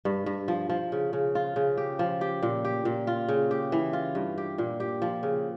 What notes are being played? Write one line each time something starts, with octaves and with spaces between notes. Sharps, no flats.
G2
G2
F3
F3
C#3
C#3
F4
C#3
G4
F3
G4
A#2
G4
A#2
F4
C#3
G4
E3
F4
G2
G4
A#2
G4
F3
C#3